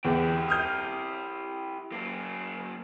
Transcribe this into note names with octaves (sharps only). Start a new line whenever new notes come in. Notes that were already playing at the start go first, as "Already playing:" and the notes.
E2 E4 G4
D#6 F6 G6
F#2 A#3